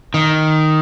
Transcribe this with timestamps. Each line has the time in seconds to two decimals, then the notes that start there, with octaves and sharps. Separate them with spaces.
0.14 D#3